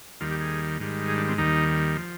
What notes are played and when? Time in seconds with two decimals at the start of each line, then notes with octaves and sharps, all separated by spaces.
0.21 D#2 D#3 G3 F4
0.31 G4
0.40 G#4
0.79 G#2 D#3 G3
1.08 G#4
1.18 D4
1.28 C4
1.38 D#2 D#3 G3 D#4
1.96 F3